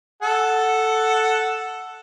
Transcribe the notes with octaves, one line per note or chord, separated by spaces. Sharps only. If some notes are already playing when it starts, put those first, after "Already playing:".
A4 F#5